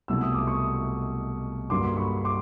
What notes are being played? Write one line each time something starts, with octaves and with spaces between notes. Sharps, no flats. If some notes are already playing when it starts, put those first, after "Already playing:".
C2 B2 F#3 A3 E6
D#6
D6
C#6 D#6
G2 D3 F#3 A#3 C6 D6
B5 C#6
C6 D6